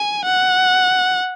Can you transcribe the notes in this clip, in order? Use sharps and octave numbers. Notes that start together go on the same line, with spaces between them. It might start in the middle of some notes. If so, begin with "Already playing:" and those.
Already playing: G#5
F#5